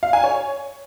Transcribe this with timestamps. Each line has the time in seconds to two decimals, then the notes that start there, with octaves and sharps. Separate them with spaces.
0.03 F5
0.13 G#5
0.24 C#5